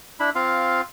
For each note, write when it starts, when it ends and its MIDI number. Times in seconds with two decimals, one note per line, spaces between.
0.20 0.30 62
0.20 0.30 64
0.20 0.30 83
0.35 0.81 60
0.35 0.81 65
0.35 0.81 77